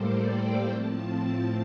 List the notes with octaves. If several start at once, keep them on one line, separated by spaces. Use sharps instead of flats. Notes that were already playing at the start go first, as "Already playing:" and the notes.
Already playing: A2 G3 A#3 A4 C5 D5
G5
A2 F3 C4 A5